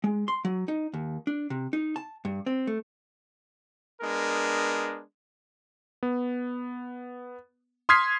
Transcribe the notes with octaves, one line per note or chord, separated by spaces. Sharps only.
G#3
C6
F#3
D#4
D#2
D4
C3
D#4
A5
G2
C4
A3
G#3 B3 D4 A#4
B3
C6 D#6 F6 G#6 B6 C7